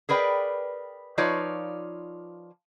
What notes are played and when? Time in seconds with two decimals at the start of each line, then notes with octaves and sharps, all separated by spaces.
0.09 G#4 A#4 B4 D5 G5
1.18 F3 D#4 F4 B4 C#5 D5